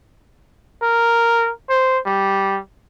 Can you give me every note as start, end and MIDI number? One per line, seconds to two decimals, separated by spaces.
0.82 1.50 70
1.69 1.98 72
2.06 2.59 55